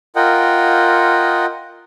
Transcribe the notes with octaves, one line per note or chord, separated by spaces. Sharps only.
F4 A#4 D#5 F#5 G5